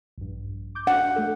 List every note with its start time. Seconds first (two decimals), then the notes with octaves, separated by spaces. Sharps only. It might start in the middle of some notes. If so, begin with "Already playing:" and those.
0.18 A#1 G2
0.75 D6 G6
0.87 D4 F#5
1.16 A3 A4